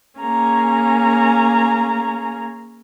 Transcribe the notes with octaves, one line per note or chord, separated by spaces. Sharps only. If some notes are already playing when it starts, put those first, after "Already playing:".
A#3 C#4 G#4 A#5